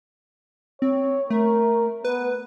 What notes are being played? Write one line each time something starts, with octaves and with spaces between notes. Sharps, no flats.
C4 C#5
A3 A#4
B3 B4